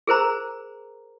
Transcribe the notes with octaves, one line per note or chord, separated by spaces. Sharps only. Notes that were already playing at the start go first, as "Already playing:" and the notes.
G#4 A#4 C5 A#5